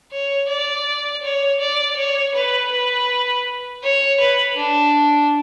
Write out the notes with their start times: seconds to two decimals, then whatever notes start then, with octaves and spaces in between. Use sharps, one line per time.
0.12 C#5
0.48 D5
1.23 C#5
1.60 D5
1.96 C#5
2.34 B4
2.71 B4
3.83 C#5
4.20 B4
4.56 D4